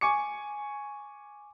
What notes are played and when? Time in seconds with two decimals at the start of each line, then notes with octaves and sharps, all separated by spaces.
0.01 G#5 C#6 D6 C#7